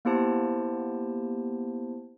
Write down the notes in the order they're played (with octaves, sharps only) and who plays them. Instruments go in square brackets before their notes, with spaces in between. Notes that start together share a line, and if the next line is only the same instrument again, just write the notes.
[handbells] A#3 B3 E4 G4 C5 A5